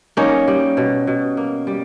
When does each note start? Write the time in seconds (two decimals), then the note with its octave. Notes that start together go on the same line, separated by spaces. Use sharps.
0.17 A#3 C#4 D#4
0.48 G3
0.77 B2
1.07 B2
1.37 A#3
1.67 G3